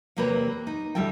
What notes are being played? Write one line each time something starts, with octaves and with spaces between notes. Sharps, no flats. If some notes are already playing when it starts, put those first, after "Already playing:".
E2 C3 A#3 G4 B4 C#5
D#4
E2 D3 G3 E4 A4 G5